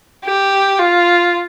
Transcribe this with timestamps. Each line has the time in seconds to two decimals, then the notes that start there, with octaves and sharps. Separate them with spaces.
0.25 G4
0.79 F4